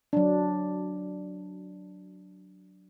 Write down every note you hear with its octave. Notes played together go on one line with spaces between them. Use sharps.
F#3 D4